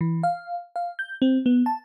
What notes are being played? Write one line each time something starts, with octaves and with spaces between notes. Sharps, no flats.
E3
F5
F5
G6
C4
B3
A5